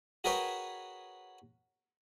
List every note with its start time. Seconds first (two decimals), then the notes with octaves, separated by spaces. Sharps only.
0.24 F#4 G#4 A#4 B4 C#5 G5